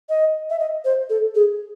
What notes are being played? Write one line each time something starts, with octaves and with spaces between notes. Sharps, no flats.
D#5
E5
D#5
C5
A4
G#4